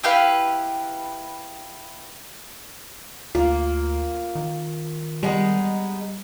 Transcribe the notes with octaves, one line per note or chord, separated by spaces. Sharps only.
E4 G4 B4 F5
D2 A#3 F4
D#3
G3 G#3 B3 D#4